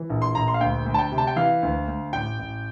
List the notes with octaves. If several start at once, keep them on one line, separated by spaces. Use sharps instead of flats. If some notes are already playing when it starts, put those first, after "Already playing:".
Already playing: E3
A#1
C6
A#1 A#5
C6
F5
D2 G5
D2
A5
G5
C3
A5
G5
E3 F5
D2
D2
A1 G5
A1